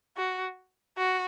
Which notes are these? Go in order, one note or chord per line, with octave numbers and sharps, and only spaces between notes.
F#4
F#4